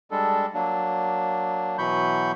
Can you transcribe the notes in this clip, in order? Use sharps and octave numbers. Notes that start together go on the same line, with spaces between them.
G3 G#3 D4 A4
F#3 A#3 D4
B2 E3 F#3 B5 C#6 G6